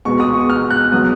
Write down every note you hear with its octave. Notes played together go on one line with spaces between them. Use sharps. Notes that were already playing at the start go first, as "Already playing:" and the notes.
B2 G#3 B3 C#6
D#6
C#6
F6
F#6
B2 F#3 B3 D#6